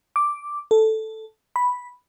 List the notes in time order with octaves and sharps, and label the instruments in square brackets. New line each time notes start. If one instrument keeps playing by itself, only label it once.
[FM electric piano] D6
A4
B5